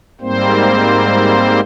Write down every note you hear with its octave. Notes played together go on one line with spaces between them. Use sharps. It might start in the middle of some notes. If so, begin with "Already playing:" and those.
G#2 G3 A#3 C4 C5